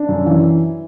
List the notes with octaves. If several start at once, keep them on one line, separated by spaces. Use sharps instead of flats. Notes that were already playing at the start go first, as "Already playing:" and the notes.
Already playing: D4
F#2
E3